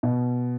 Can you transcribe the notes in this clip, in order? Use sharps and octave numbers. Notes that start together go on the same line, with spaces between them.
B2